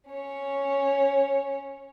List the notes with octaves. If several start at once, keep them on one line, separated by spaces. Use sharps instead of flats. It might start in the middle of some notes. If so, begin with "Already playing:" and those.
C#4 C#5